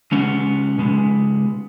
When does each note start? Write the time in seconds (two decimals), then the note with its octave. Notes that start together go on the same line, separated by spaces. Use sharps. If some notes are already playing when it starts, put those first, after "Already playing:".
0.12 C#3 G#3 B3 C#4
0.78 C#3 G#3 B3